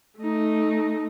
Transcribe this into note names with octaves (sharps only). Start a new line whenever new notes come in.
A3 D#4